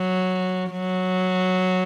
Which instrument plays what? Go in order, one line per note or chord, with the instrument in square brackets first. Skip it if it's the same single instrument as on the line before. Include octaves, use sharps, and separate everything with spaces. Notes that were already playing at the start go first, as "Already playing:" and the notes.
Already playing: [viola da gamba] F#3
F#3